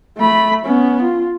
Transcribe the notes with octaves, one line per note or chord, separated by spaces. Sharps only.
A3 B5
B3 C#4
F4